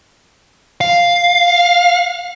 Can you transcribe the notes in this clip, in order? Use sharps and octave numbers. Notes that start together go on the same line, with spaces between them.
F5